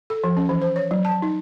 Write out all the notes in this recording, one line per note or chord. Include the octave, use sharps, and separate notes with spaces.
A4
F3
C#4
E3
C5
C#5
F#3
A5
D#4